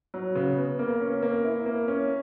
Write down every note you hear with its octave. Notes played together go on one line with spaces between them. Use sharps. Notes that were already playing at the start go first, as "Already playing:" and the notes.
F#3
C#3
B3
A#3
C#4
A#3
E4
A#3
C#4